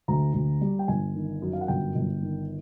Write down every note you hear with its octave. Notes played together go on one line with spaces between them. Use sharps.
D2 A#5
D2
G3
G5
G1 G#5
D#3
F#2
F5
F#5
G1 G5
G1
D#3